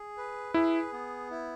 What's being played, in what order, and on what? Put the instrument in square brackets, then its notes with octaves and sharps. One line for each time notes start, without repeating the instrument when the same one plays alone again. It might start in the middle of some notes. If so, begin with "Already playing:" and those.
Already playing: [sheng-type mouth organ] G#4
B4
[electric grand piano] E4 [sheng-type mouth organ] G#4
[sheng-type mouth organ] B3
E4